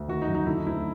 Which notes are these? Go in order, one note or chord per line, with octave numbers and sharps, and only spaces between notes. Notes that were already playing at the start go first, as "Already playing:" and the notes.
Already playing: D2
D#3 F#4
D#4
F#2
D#4
D3 E4
D#4
D2 E4